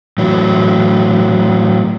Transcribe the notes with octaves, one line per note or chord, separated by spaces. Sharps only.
A2 E3 F#3